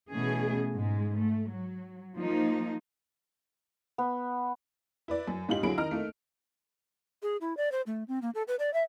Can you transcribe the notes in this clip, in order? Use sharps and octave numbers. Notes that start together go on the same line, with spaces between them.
B2 E3 A3 C#4 G#4
G#2 G#3
A3
F#3
F3 A#3 D#4
B3
E4 B4 D5
F#2
G#2 C#3 D#4 F4 G4 F#7
D3 F#3 E4 G#4 B5 D7
D#3 D#5 A#5 F6
A3 A#3 D#4
G#4
E4
D5
C5
A3
C4
A#3
A4
B4
D5
E5